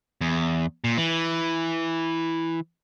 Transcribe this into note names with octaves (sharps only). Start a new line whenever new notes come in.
E2
A#2
E3